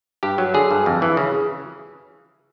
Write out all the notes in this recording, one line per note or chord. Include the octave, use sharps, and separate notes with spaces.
G2 G4
F#3
D3 G#4
G2
F2
E3
C#3